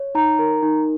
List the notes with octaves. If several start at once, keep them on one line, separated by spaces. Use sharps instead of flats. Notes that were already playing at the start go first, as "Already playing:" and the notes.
Already playing: C#5
D#4 A#5
A#4
D#4